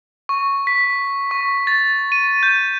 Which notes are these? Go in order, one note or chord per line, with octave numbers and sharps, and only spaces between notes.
C#6
B6
C#6
A6
D#7
G6